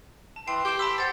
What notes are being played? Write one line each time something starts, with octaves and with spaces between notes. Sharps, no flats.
A5
E3 G5 C6 C7 E7
G4 G6 D7 E7
A5 B5 D6 E6
C5 F#5 A6